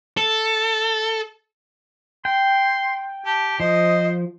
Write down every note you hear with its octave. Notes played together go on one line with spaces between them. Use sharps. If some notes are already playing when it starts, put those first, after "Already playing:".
A4
G5 C6
G4 A5
F3 C5 D#5